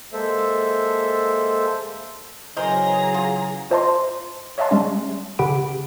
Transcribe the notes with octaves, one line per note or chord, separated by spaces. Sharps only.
G#3 A#3 A4 C5 E5
C#3 E3 F#3 G#4 A#4 C5 D#5 A#5
F4
F4 C5 D#5 A5 A#5 C6
C#5 D#5 E5 F#5 A5 C6
G3 G#3 C#4
C#3 G4 G#4 F#5 B5 D7